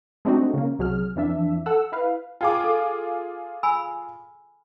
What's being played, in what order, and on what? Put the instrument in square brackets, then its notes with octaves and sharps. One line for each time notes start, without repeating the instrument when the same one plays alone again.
[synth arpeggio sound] G#3 A3 C4 D4 D#4 F#4
C#3 A#3
C2 F#3 G#4 F6
F2 E3 D4 E5
A4 F#5 E6
E4 B4 F5
[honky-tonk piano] F4 G#4 D6 [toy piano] G5
[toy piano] A4
G#5 B5 E6